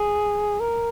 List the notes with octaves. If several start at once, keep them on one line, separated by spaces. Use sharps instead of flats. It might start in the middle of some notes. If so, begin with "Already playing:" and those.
Already playing: G#4
A#4